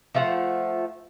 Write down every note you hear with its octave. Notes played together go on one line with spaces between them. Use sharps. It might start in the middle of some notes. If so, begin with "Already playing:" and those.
F3 A3 F4 F#5